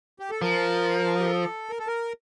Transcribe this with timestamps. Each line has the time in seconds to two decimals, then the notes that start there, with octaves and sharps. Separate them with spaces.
0.19 G4
0.30 A4
0.42 F3 A#4
1.20 G4
1.27 A4
1.69 A#4
1.79 A4
1.87 A#4